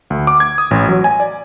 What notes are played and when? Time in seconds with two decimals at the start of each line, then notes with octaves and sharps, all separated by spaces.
0.10 D2
0.27 D6
0.40 G#6
0.58 D#6
0.71 A1
0.89 F#3
1.04 G#5
1.20 D5